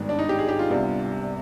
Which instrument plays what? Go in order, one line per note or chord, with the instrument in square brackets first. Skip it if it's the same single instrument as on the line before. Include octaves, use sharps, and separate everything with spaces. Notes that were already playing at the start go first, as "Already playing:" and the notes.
Already playing: [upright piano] G#1 G2 D#3 G#3 B3
[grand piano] D4
D#4
G4
G#4
G4
F4
[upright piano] C2 C3 G3 B3 D4